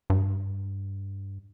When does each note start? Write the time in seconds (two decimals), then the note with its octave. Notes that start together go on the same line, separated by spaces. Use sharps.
0.10 G2